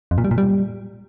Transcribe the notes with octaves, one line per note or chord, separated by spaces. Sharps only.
F2
A#2
G3
A#2
G3